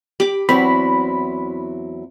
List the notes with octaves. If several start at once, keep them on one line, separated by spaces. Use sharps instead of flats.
G4 B5 D6
E2 F#3 C4 E4 B5